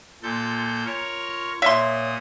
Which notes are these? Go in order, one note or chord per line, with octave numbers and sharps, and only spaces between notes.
A#2 F4 A4 G6
F4 A#4 C#5
A#2 C#5 E5 C6 D#6